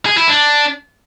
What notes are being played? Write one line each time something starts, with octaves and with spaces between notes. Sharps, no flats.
G#4
E4
D4